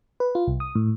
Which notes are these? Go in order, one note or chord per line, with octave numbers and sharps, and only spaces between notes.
B4
F4
C2
D#6
A2